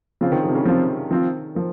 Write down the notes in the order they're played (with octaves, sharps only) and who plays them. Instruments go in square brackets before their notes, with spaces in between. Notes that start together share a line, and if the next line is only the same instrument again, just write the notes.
[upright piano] C#3 [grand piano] F3 C4 F4
[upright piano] D#3
F3
C3
C#3
[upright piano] C#3 [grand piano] F3 C4 F4
[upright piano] D#3 [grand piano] F3 C4 F4
[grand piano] F3 [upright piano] A#3